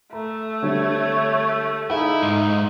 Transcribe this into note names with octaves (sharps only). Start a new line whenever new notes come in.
A3 A#5
D3 G3 C4 C#5
D#4 E4 G#4 F5 G#5
G#2